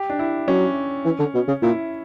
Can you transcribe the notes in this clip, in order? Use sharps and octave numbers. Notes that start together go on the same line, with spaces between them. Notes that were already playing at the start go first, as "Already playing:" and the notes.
Already playing: G4
D4
E4
F#3 C#4
E3
D3
B2
C#3
A#2 E4